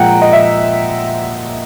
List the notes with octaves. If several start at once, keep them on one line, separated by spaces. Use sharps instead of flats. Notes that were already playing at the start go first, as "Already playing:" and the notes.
Already playing: A#2 F3 G#3 F#5 G5 A#5
D#5
E5